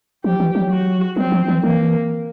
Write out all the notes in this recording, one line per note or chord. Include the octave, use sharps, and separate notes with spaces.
F3 G4
E3
F#3
F#4
F#3 C4
F3
E3
E3 A#3